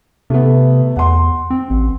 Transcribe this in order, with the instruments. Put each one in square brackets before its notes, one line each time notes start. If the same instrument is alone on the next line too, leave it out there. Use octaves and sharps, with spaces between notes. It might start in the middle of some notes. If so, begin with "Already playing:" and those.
[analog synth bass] C3 [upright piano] A3 B3
[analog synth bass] E2 [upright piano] F#5 C6
[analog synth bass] C4
A1